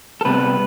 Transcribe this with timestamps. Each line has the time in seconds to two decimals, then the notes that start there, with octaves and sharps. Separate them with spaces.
0.21 A4
0.25 C3 G3 B3 B4